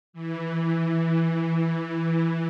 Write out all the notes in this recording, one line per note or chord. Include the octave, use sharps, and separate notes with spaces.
E3